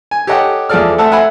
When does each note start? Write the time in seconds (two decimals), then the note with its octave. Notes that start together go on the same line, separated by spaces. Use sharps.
0.11 G#5
0.27 G4 A4 C#5 D#5 F#5 G5
0.69 E2 F3 G#4 A4 D5 F6
0.98 A3 C4 A4 E5 F#5 A5
1.12 E5 F#5 G#5 B5